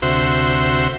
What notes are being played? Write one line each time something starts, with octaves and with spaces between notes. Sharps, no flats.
D2 C3 F#4 C5 E5 C6